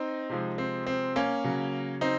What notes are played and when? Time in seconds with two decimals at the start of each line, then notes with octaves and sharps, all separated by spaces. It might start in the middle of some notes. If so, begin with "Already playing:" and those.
Already playing: C4 D#4
0.30 C3 F3 G#3
0.58 C4
0.87 C4
1.16 A#3 C#4
1.44 C#3 F#3
2.01 C4 D#4